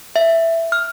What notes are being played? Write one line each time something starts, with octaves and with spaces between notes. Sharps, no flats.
E5
F6